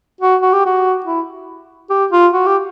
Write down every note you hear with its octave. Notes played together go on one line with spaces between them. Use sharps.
F#4
F#4
G4
F#4
E4
G4
F4
F#4
G4